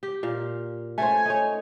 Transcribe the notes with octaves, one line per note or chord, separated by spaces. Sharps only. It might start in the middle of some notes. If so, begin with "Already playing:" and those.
G4
A#2 F5
A3 C#4 C5 G#5
D#4 C#5